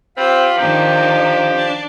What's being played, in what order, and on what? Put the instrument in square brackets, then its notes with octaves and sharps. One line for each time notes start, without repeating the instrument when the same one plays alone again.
[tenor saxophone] C4 [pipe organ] F4 B5 [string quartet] G4
[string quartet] D#3 D4 D#4 [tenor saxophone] F3 [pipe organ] G4
[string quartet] D4